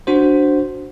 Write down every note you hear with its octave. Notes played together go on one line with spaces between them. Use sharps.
D4 F#4 C5